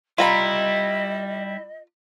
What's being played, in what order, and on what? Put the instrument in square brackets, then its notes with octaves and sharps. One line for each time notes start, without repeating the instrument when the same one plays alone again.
[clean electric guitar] G3 E4 [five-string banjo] F4 A#5 B5 [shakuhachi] D#5